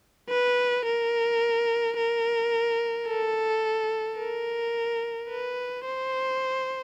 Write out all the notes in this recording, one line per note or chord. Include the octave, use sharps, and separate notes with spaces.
B4
A#4
A#4
A4
A#4
B4
C5